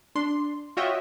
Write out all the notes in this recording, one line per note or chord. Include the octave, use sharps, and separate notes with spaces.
D4 C6
F4 F#4 C#5 D#5 E5 G5